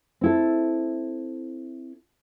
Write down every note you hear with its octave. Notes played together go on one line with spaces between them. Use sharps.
C4 E4 A4